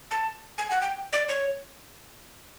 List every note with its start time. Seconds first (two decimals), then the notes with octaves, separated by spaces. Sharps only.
0.11 A5
0.58 G#5
0.71 F#5
0.82 G5
1.13 D5
1.29 C#5